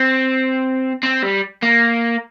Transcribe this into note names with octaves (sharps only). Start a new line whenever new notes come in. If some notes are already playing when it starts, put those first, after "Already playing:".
Already playing: C4
C4
G3
A#3